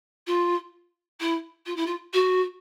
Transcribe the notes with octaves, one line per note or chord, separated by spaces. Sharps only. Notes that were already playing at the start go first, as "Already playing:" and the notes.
F4
E4
F4
E4
F4
F#4